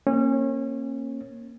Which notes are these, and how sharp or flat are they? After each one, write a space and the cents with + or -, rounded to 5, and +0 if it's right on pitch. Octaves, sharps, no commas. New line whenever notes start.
A#3 +0 C#4 -30